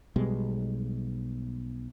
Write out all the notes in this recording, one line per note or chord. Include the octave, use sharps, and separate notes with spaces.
B1 B2 G3 G#3